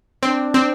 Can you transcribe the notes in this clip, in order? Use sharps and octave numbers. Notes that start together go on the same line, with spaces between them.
C4 D4
C4